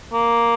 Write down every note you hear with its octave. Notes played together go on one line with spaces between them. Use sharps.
A#3